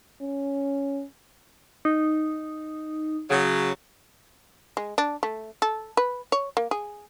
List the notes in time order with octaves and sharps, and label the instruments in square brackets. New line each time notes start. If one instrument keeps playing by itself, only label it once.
[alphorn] C#4
[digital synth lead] D#4
[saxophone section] C#3 F#3
[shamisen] G#3
D4
A3
A4
B4
C#5
A#3
G#4